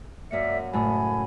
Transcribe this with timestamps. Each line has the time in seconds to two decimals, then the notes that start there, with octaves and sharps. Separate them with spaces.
0.31 F#2 A#3 D5 E5 C#7
0.73 F#1 A2 A3 G#5 B5